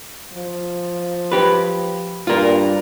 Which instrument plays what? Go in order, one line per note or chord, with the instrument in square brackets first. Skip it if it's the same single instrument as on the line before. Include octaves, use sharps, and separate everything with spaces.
[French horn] F3
[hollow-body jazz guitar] G4 B4
[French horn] G2 [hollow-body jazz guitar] F4 A#4